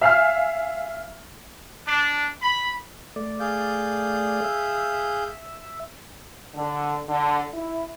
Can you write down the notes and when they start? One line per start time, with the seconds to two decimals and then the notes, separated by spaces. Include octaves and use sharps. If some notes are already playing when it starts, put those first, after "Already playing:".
0.01 E5 F5 G#5 F6
1.87 D4
2.42 B5
3.16 A3 D5
3.40 G#4 F5 G6
4.44 E5
6.55 D3
7.08 D3
7.54 E4